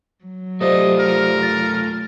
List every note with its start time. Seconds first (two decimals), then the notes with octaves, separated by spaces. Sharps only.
0.24 F#3
0.61 A3 F4 G4 C5 D5 D#5
0.99 A#4
1.43 A6